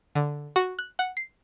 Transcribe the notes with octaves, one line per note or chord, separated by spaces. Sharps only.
D3
F#4
F#6
F#5
C7